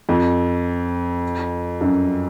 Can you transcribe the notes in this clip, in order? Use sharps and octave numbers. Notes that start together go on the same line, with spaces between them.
F2
F#2